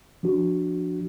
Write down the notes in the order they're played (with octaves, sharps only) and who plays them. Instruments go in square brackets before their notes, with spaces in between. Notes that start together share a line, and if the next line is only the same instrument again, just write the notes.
[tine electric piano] F3 D4 F#4